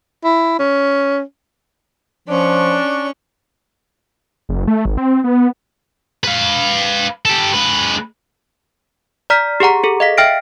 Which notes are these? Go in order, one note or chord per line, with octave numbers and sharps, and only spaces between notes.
E4
C#4
F3 C#4 D4 C#6
F#1
A3
G#1
C4
B3
B4 F5
G4 A4
G#3 B4
D5 A#5 F6 B6
G4 G#4 F#5 A#5
G#4 A4
D#5 F5 B6
E5 G5 F6 A#6 D7